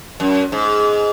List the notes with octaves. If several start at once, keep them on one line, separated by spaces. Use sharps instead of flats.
F#2
G#2